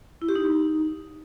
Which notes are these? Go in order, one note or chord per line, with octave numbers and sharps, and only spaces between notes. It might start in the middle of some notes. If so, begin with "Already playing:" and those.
E4
G4
D#4